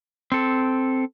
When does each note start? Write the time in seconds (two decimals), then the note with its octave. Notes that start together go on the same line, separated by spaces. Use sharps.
0.32 C4 A4